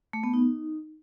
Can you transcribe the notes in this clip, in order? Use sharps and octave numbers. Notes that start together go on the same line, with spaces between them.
A3
B3
D#4